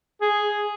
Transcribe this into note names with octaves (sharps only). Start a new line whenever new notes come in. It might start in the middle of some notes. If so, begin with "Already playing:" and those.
G#4